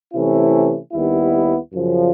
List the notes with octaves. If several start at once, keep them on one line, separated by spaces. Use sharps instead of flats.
C3 E3 A3 C#4 E4
D#2 D#3 G3 B3 E4
F#2 C#3 F3